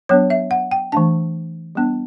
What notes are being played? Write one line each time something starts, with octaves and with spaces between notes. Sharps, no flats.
F#3 B3 D4 C#5
E5
F#5
G5
E3 A3 D4 A5
G3 B3 D4